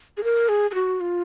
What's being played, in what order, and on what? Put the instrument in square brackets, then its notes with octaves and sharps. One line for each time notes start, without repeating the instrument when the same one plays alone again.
[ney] G#4
A#4
G#4
G#4
F#4
F4